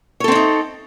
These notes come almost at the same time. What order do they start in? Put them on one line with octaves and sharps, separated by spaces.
C#5 A4 C4 D4 D#4